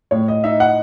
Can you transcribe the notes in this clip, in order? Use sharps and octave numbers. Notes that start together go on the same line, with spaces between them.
A2 C#5
D#5
D#4 E5
F#5